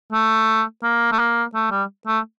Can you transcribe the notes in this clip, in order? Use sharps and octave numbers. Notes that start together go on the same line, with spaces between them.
A3
A#3
A3
A#3
A3
G3
A3